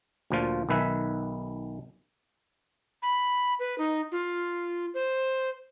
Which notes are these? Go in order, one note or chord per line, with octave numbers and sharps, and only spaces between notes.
D2 A#2 F3 F4
B1 D#3 B4 E5 G#5
B5
B4
D#4
F4
C5